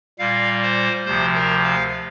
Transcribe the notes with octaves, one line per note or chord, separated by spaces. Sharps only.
A#2 G3 F5
C5
D2 C3 F3 C5
A#4
F5